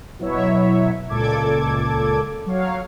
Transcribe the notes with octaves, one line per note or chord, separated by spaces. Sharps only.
B2 F#3 E4 C#5 E5
C#2 A#2 A4 D6 G#6
F#3 C#5 F5